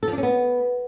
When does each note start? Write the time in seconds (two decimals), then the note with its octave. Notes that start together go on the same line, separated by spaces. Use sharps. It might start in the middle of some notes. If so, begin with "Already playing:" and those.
0.03 A4
0.08 F3
0.13 D4
0.18 C#4
0.23 B3